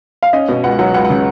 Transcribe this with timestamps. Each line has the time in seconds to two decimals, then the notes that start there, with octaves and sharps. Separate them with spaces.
0.23 F5
0.33 C#4 D#5
0.49 B2
0.64 C#2 F#5
0.79 F#3 F#5
0.94 C#2 F#5
1.04 F#5
1.10 C#3